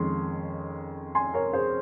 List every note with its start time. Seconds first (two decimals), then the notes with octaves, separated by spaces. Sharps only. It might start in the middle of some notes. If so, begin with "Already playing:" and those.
Already playing: F2 D#3 G#3 C#4 C6
1.15 G#5 C6
1.34 A#4 C#5
1.53 G#4 C5